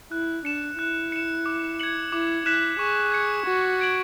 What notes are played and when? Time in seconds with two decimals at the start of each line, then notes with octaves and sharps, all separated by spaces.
0.12 E4 F#6
0.45 D4 C#7 E7
0.79 E4 F#6
1.12 C#7 E7
1.46 D6
1.80 G#6 C#7 F#7
2.12 E4 D6
2.46 E4 F#6 B6 E7
2.79 G#4 C#6
3.12 G#6 C#7
3.46 F#4 C#6
3.80 G#6 D7 F#7